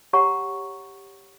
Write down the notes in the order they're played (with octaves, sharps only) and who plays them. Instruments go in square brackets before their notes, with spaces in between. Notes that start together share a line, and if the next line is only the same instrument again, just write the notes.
[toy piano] G4 C#5 F#5 A#5 C#6